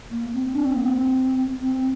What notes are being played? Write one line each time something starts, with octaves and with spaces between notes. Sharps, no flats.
A#3
C4
D4
C4
A#3
C4
C4